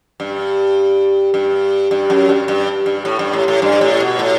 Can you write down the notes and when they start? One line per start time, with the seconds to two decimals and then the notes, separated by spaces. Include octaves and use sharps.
0.20 G2
1.34 G2
1.91 G2
2.10 F#2
2.29 G2
2.48 G2
2.86 G2
3.05 A2
3.19 G2
3.33 A2
3.48 A2
3.62 G2
3.81 A2
4.00 B2
4.19 A2